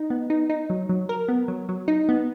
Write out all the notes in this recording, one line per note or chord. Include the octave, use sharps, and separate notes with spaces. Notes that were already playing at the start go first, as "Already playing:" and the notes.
Already playing: D#4
B3
D#4
D#4
F#3
F#3
A#4
B3
F#3
F#3
D#4
B3